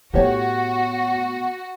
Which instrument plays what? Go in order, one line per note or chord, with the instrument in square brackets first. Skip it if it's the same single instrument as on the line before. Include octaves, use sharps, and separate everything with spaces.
[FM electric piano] A2 [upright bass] B3 [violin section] F#4 [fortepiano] G4 C#5